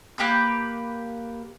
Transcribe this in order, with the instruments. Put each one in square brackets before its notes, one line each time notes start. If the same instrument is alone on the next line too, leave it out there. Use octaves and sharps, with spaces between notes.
[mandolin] A#3 G4 B4 G6